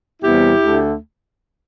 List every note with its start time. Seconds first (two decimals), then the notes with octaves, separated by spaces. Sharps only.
0.21 E2 C3 G3 B3 E4 G4
0.62 D2 D3 A3